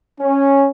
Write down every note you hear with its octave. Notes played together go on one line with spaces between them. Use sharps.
C#4